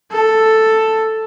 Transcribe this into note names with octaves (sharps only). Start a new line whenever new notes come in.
A4